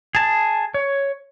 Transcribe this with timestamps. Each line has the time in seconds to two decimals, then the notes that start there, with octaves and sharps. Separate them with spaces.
0.15 G#4 A5
0.74 C#5